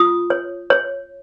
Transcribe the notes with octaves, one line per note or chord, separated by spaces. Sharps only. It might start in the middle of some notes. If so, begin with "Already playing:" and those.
Already playing: F4 D#6
C#5
C#5